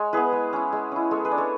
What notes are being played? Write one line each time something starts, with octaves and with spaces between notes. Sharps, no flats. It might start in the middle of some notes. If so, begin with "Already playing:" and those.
Already playing: G#3 C#5
B3 E4 G#4 B4
G#3
C#4 E4
G#3
C#4 E4
G#3 A4 C#5
G#4 B4
D4
A4 C#5